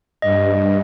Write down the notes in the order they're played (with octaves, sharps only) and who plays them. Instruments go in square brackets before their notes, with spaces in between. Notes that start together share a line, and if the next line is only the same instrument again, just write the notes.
[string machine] G2 [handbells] D#5